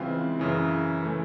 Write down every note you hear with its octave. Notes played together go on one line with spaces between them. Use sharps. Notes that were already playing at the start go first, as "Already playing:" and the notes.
Already playing: C#3 E3 G#3 C4 F4
F#2 C#3 E3
E3 A3